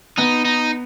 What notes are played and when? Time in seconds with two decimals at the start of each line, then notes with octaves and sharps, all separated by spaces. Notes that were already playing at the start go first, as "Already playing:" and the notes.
0.18 B3 D#4
0.45 D#4